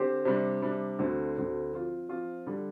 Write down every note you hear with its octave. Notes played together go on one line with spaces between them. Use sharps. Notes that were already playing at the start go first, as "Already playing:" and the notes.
Already playing: D3 C4 G4 C5
C3 G3 D4
C3 G3 D4
D2 D3 A3 C4
D2 D3 A3 C4
F3 C4 F4
F3 C4 F4
D3 G3